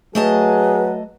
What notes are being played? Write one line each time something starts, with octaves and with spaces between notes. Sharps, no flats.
F#3 A3 G#4 B4 D#5 A5